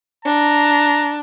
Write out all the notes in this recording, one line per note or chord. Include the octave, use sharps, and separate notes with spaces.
D4 A#5